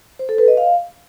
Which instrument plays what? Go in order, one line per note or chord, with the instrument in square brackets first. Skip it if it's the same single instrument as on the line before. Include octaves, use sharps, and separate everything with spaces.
[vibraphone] C5
A4
B4
D#5
F5